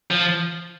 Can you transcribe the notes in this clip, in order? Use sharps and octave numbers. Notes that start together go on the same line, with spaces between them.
F3